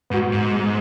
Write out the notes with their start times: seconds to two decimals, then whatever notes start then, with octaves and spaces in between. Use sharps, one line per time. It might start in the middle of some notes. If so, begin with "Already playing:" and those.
0.10 G#2 B3
0.14 F#4
0.32 G#2
0.53 G#3